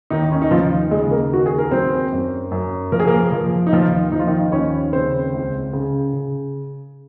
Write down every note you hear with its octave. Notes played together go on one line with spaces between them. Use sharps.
D#2 D#3 D#4
C#4
D#4
D#2 F3 F4
C#3 G#3 G#4
A#3 A#4
D#2 F#4
G#4
A#4
F#3 C4 C5
F#2
F#2
F3 A#4
G#4
A#3 A#4
F3
D#4
D#2 F3 F4
F3 D#4
F4
D#3 D#4
D#2 C#4 C#5
C#3 C4 C5
C#2
C#3
C#3